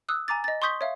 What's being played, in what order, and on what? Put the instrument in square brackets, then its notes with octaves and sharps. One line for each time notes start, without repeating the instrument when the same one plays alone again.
[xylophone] D#6 E6 F#6
G#5 A#5 D6 A6
D#5 A6
C6 C#6 D#6 G6 B6 G7
C#5 E5 F5